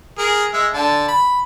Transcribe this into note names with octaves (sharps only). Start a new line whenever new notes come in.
G#4 A#4
G#3 E5
D3 A5
B5